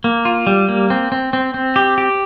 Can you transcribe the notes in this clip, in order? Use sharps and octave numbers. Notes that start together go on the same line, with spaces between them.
A#3
F4
G3
A#3
C4
C4
C4
C4
G4
G4